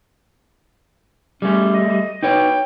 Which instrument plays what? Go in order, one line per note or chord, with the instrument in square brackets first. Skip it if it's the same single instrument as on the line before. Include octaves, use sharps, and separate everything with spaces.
[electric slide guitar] G3 A3 [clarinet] C#4
[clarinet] D#5
[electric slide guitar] D#4 B4 C#5 [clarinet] G5